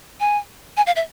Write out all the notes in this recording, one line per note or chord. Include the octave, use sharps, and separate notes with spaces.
G#5
G#5
F5
E5